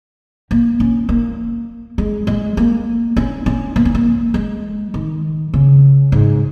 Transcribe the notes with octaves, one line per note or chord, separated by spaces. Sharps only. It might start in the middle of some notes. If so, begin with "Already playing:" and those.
A#3
C#4
A#3
G#3
G#3
A#3
C#4
C#4
A#3
C#4
A#3
G#3
D#3
C#3
G#2